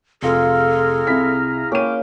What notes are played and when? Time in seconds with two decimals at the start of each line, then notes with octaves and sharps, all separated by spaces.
0.23 F1 G#3 F4 G#4 A4 A#5 F6
1.07 C2 C3 E4 G#5 B6
1.72 A#3 C#4 G#4 F5 G5 D6 F6 D#7